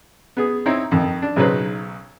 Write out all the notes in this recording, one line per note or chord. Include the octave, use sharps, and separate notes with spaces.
B3 G#4
C4 D#4 E4 C#5
F2 D#3
D4
B1 C#3 F#3 D#4 B4 C5